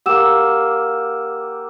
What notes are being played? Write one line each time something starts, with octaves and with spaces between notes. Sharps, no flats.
A#3 G4 F#5 E6 E7